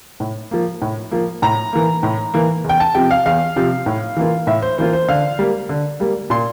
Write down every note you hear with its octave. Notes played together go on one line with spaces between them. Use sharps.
A2
F3 A#3
A2
F3 A#3
A2 A#5
E3 A#3
A2
E3 A#3
E2
G5
A5
C3 F3 C4 G5
F5
E2 F5
C3 F3 C4
A2
E3 A#3 F4
A2 E5
C5
E3 A#3 F4 C5
C5
D3 F5
G3 A#3
D3
G3 A#3
A#2 C6